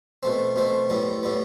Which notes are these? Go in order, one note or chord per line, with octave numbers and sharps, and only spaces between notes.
B2 A3 C4
B2 A3 C4
A2 G3 B3
A2 G3 B3